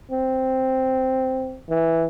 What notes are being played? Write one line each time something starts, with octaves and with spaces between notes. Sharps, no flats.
C4
E3